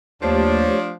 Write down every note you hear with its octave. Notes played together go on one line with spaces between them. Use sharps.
D#2 F3 A3 D4 G4 C5 C#5